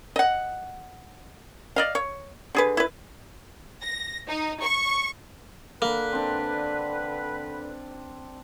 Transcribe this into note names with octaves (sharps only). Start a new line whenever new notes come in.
D#5 F#5
D5 D#5 F5
C#5
D3 G#4 B4
E4 B4
A#6
D#4
C#6
D3 A#3 B4
C4 D4